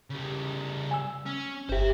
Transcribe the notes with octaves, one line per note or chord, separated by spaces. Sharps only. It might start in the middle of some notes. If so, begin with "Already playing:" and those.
C#3 G3
G#5 E6
C#4
G1 G4 C5 E5